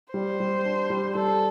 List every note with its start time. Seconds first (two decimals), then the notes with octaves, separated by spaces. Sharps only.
0.14 G3 C5
0.40 G3
0.65 D4
0.90 G3
1.15 G3 A4